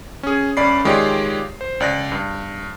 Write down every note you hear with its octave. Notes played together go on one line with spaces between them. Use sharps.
C#4 G#4
G1 C#4 D5 B5 C7
D#3 G#3 F4 G4 C#5 D5
C5
C#2 D5 F#6 A#6
G2